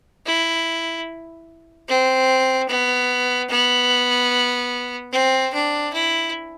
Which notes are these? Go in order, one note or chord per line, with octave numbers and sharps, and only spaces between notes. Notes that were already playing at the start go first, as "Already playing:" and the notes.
E4
C4
B3
B3
C4
D4
E4